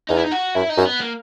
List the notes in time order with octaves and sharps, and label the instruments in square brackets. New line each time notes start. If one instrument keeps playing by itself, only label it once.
[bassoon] E2 [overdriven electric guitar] D#4
[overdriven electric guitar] E4
D#4
F#4
[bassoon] F#2 [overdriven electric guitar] E4
[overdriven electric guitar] D#4
[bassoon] F#2
[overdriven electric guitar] B3
A#3